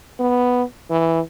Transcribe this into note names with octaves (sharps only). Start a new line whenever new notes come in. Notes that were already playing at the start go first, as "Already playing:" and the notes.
B3
E3